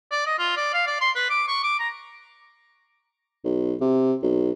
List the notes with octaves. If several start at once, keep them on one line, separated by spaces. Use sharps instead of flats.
D5
D#5
F4
D5
F5
D5
C6
B4
D6
C#6
D6
A#5
B1
C3
B1